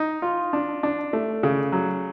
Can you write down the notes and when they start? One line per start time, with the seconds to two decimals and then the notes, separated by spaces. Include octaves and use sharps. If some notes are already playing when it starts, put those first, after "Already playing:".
Already playing: D#4
0.22 F4
0.53 D4
0.83 D4
1.13 A3
1.43 C#3
1.72 F#3